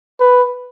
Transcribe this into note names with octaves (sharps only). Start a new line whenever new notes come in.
B4